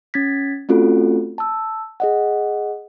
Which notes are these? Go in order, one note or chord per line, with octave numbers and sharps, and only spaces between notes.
C#4 G#6 A6 B6
A3 C4 C#4 F4 F#4 A4
A5 E6
G#4 D#5 F#5